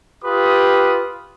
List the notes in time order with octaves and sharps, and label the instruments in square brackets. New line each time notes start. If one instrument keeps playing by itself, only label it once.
[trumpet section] F4 G4 B4 D#6